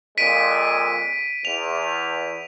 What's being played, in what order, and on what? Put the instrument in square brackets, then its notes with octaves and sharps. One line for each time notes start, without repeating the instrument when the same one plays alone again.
[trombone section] F2 A#2 G#3 [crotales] B6 D7 D#7
[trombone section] E2 [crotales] F7